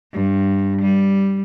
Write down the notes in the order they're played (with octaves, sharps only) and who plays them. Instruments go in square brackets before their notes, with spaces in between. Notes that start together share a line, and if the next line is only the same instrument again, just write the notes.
[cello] G2
G3